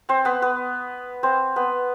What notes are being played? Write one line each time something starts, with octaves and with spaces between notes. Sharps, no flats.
C4 C5
B3 B4
B3 B4
C4 C5
B3 B4